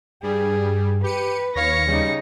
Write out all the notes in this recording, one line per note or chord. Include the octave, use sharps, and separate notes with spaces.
G2 G3 G#4
G4 B4 C#7 D#7
D#2 C#5 F5 A#6 C#7
C#3 G3 D#4